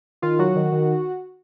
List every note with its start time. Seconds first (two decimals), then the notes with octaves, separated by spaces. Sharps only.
0.22 D#3 F4
0.39 F#3 F#4
0.56 D#3
0.72 D#3